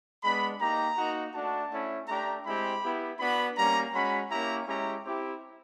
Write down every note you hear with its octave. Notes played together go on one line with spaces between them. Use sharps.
G#3 B3 D4 B5
A#3 D#4 G4 A#5
A#3 D#4 F#4
A3 D4 F#4 A5
A3 C#4 E4
A3 D4 G4 A#5
G#3 C4 E4 G4 B5
B3 E4 G4
B3 D4 F#4 B5
G3 A#3 C#4 A#5
G#3 C#4 F#4 B5
A#3 C#4 E4 G4 A#5
G#3 C#4 E4 G4 A#5
C4 E4 G4